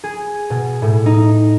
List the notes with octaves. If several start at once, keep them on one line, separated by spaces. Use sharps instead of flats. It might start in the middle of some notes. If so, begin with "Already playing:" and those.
G#4
B2
A2
D#4